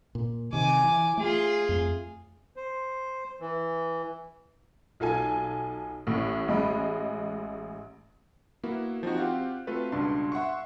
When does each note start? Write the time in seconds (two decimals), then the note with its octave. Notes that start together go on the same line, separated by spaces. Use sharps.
0.15 A#2
0.53 C3 D#3 G#5 D6
0.84 E3
1.18 A3 F4 G#4
1.69 F2 A3
2.56 C5
3.40 E3
5.00 B1 F4 A4 G#5
6.07 A1 A2
6.48 A1 G#3 D#5 B5
8.64 A#3 B3 E4 F#4
9.03 F3 C4 D#4 F#4
9.18 C4 F4 G4 F5 F#5
9.67 A3 C4 F4 F#4 A4 B4
9.92 C#2 G2 B2 D4 C6
10.32 E5 F#5 C6 C#6